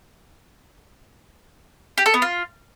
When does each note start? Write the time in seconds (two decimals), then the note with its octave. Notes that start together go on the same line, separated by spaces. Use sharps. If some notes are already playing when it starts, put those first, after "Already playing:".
1.98 G4
2.06 A4
2.14 B3
2.22 F4